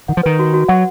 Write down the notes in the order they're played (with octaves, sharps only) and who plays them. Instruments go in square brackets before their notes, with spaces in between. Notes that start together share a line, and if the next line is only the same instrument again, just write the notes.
[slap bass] D#3 [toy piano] F#5
[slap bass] F3
[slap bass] D#3 [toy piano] B4
[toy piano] F#4
F#4
[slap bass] F#3 [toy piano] F#5